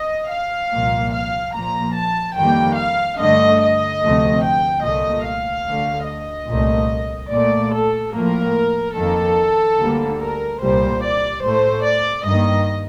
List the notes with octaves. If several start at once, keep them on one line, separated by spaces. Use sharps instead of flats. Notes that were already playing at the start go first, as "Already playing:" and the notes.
Already playing: D#5
F5
C2 A#2 F3 A#3
F5
A#2 F3 A#3 A#5
A5
F2 D#3 G3 A#3 G5
F5
G2 D3 A3 D#5
D#5
D2 C3 F3 A3
G5
C2 A#2 A3 D#5
F5
D2 D3 A3
D#5
C2 A#2 A3
A#2 A3 D5
A4
A2 F3 A#3 A#4
F2 D#3 A#3 A4
D2 D3 G3 A#3
A#4
C2 A#2 G3 C5
D5
A2 A3 C5
D5
G2 D#3 A#3 D#5